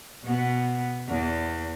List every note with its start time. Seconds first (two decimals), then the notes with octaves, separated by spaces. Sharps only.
0.24 B2 B3
1.08 E2